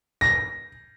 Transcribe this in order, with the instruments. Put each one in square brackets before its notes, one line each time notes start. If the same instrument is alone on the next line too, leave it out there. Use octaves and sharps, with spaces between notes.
[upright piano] A#6